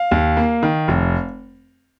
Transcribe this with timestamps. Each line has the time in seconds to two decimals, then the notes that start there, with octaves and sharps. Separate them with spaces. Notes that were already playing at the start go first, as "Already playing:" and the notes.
Already playing: F5
0.11 D#2
0.37 A#3
0.63 D#3
0.88 F1